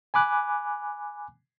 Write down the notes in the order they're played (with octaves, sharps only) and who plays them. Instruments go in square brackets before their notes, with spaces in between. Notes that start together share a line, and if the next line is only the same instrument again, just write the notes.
[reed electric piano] G#5 B5 D6 F#6